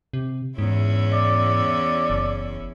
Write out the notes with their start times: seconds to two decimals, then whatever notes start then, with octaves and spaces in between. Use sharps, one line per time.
0.13 C3
0.58 E2 G#2 C#4 E4
1.13 D5
2.10 F#1